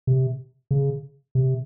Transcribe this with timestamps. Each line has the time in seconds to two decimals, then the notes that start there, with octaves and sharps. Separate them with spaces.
0.07 C3
0.71 C#3
1.35 C3